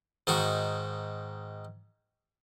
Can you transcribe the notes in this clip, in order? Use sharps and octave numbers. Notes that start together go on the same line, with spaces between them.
G#2 D#3 F#4